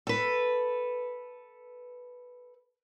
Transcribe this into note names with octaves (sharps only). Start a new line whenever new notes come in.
A4 B4